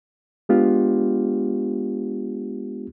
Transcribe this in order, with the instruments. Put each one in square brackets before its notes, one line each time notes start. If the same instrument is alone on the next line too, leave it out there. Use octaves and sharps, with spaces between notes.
[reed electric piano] G#3 B3 D4 F4 G4